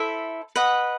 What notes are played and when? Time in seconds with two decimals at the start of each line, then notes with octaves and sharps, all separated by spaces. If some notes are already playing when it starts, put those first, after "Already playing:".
Already playing: E4 A4 C5 E5
0.56 B4 D#5 F#5